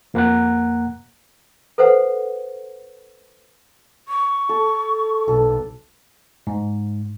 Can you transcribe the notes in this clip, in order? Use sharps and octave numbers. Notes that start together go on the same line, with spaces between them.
F2 A#3 F#5 A#5 F#6
A4 B4 C5 F#5
C#6
A4
B1 A4
G#2